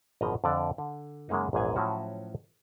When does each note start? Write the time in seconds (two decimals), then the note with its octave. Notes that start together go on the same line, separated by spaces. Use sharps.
0.21 G#1 F#2 B2 F3 D#5 A#5
0.44 F2 D3 D5
0.78 D3
1.29 F#2 C#3 G#3 A#3 D#4
1.53 A#1 E2 G#2 G#4 G#5
1.76 A2 F3 F#3 C#4 F#4